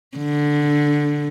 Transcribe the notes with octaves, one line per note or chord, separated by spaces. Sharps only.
D3